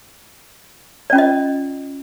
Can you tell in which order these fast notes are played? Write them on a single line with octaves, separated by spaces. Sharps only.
D5 C#4 F4 D#5